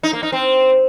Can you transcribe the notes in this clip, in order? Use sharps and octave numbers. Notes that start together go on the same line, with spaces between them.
D#4
A#3
D#4
C4